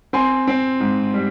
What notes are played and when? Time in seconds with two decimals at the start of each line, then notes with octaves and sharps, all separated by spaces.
0.13 C4 G#5 C6
0.47 C4
0.80 G#2
1.14 G3